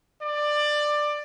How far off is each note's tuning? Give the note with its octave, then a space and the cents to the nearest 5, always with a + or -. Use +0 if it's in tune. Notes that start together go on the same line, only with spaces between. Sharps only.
D5 +15